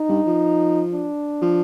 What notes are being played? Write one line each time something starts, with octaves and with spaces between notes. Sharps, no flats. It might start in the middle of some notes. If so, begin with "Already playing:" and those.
Already playing: D#4
G2
F3
D4
F3